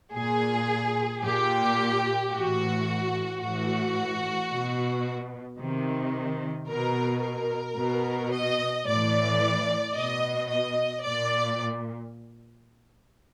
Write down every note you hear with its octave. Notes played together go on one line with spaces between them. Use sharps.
A#2 G#4
A#2 G4
A2 E3 F#4
A2 E3 F#4
B2
C3 D#3
B2 A#4
A#4
B2
D#5
A2 E3 D5
B2 D#5
D#5
A#2 D5